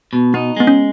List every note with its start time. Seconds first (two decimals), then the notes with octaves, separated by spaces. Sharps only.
0.13 B2
0.34 B3 D#4
0.57 G#3 B3
0.67 C#4